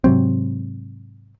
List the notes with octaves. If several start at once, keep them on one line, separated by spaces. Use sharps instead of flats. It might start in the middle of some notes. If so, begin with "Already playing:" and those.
G#2 C3 F#3 C4